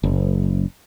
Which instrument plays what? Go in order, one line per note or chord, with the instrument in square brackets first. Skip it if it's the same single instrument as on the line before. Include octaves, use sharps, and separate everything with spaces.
[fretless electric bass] F#1